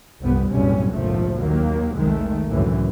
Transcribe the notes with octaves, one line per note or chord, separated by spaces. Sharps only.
G1 C2 F2 G3 B3
F#1 B1 A2 C3 G3 C#4
F1 A#1 D#2 G#2 F3 A3
D#2 D#3 F#3 A#3
F1 C2 D#3 G#3 A3
C#2 F#2 A2 D3 E3